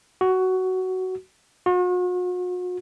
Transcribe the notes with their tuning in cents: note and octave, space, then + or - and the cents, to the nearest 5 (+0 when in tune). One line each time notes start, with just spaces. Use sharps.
F#4 +10
F#4 -45